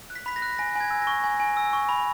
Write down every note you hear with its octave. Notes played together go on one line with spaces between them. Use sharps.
F#6
B6
B5 B6
A#6
F#6
G#5 A#6
G#5 G#6
E6
A#6
C#6
G#5
G#5
E6
C#6
B5